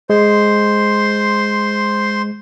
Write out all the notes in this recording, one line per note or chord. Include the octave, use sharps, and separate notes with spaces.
G#3 C5 C6